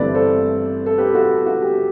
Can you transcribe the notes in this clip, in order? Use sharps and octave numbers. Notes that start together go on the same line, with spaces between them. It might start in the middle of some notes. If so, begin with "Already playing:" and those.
Already playing: G1 G2 E3 A3 C4 B4 D5
A4 C5
A4
G4 B4
F#4 A4
F#4
G4